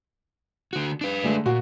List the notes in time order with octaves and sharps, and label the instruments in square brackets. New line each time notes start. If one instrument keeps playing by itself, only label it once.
[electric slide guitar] D3 F#4
D4 B4
[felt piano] D3 G#3 A3
[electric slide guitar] A#2 [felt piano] F#4